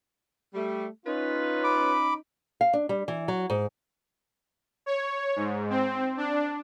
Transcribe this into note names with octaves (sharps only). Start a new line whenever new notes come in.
G3 A3
C#4 D#4 F4 B4
B5 D6
F5
D4
G3
E3
F#3
G#2
C#5
G#2
C4
D4